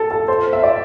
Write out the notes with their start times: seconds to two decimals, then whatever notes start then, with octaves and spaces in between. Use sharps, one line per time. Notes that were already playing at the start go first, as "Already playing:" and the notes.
Already playing: A4
0.11 A4
0.28 C5
0.53 E5
0.63 D5